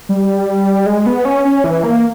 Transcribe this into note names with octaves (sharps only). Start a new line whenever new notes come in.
G3
G#3
B3
C#4
C#4
E3
A#3